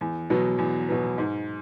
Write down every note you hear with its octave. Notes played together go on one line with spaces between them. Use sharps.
E2
B2 F#3 B3
E2
B2 F#3 B3
G#2